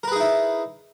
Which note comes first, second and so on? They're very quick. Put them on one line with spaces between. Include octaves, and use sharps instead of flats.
A#4 B4 G#4 D#4 E4